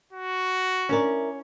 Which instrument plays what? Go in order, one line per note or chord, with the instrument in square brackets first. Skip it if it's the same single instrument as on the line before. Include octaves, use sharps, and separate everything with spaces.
[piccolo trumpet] F#4
[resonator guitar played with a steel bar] C#4 [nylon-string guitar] E4 A#4 D5